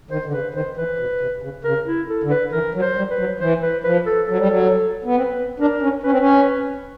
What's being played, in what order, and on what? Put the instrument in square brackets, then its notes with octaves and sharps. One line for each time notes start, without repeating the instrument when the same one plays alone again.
[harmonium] D#3 [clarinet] C5
[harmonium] D3
[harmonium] C#3 [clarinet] B4
[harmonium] D#3 [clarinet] C5
[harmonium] E3 [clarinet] B4
[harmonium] B2
C3
C#3
[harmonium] C#3 [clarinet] A#4
[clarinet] E4
A4
[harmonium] D3
[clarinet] B4
[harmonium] E3 [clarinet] A#4
[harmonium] F#3
[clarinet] C5
[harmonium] G3
[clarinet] B4
[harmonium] F#3
[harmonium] E3 [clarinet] C5
[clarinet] B4
[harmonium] F3 [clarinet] B4
[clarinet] A4
[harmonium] F#3 [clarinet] A4
[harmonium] G3
F#3
B3
[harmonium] C4 [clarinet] B4
[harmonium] D4 [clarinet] A#4
[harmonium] C#4
[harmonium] C#4 [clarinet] B4
[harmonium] C4
C#4